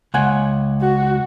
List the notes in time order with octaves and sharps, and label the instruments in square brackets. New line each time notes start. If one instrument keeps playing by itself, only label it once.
[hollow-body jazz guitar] C#2 F#5 G#5
[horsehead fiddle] F#4